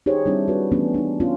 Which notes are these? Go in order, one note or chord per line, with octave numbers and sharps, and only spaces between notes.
D#4 G4 G#4 C5 C#5
G3 C4 D4 E4
F#4 B4
E3 A3 B3 C#4 D4
D4 D#4
B3 C#4 F4